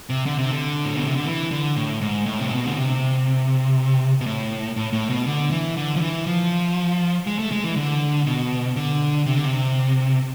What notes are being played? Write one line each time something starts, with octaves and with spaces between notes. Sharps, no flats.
C3
D3
C3
D3
A2
B2
C3
D3
E3
D3
A2
G#2
A2
C3
B2
D3
C3
B2
A2
A2
A2
B2
D3
E3
D3
F3
E3
F3
G#3
A3
G#3
E3
D3
B2
D3
C3
D3
C3